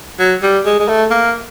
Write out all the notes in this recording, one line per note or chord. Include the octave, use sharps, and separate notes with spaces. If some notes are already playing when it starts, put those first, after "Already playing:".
F#3
G3
G#3
G#3
A3
A#3